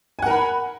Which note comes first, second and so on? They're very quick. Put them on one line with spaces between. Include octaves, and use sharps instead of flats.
G#5 F#5 A#4 B5